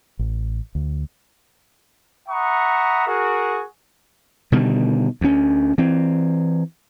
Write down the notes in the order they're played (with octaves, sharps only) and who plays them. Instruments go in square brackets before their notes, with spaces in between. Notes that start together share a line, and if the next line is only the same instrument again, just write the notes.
[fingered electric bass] A1
D2
[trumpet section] E5 F#5 A#5 B5 C#6 D#6
F#4 G#4 A#4
[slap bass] B2 D3 D#3 G3
D2 C#4
E3 C4